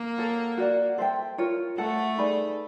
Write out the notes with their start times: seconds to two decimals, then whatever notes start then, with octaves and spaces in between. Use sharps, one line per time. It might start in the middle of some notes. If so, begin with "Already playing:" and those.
Already playing: A#3
0.18 A4 C#5 F#5
0.57 F#4 A#4 D5 F#5
0.98 A4 C5 E5 G5
1.38 F4 A#4 C#5
1.77 A3 A4 C#5 F#5 A5
2.18 D#4 G#4 B4 D5